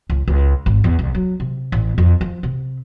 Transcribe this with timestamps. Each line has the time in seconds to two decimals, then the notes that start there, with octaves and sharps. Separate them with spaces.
0.10 C#2
0.28 C#2
0.66 G#1
0.84 E2
0.99 C2
1.15 F#3
1.40 C3
1.72 A1
1.98 F2
2.21 F3
2.43 C3